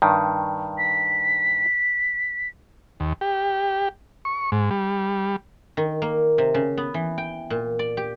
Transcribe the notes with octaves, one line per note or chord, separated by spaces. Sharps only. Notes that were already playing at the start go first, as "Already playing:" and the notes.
G2 D#3
B6
D#2
G4
C#6
G#2
G3
D#3
A#3
C3
C#3
B3
E3
G5
A#2
D5
G4